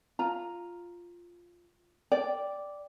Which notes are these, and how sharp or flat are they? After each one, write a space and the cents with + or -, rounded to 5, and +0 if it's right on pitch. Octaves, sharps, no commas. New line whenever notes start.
F4 +0 A#5 +0
D5 -5 G5 +0